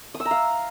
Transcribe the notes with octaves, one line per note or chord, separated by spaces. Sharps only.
D#6
E6
A#5
F5